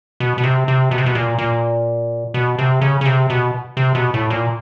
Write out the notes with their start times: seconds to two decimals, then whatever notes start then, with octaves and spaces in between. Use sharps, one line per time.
0.20 B2
0.38 B2
0.43 C3
0.68 C3
0.91 B2
0.98 C3
1.06 B2
1.15 A#2
1.38 A#2
2.34 B2
2.58 C3
2.81 C#3
3.01 C#3
3.05 C3
3.30 B2
3.77 C3
3.95 B2
4.14 A2
4.30 A#2